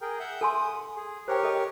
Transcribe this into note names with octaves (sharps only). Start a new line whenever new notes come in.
G#4 A#4 G5
E5 F#5 G6
A4 G#5 C6 D#6
G#4
G4 A#4 C5 C#5 G5
A4 D#5